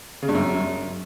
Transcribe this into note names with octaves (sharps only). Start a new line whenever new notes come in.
C#3
G2
F#2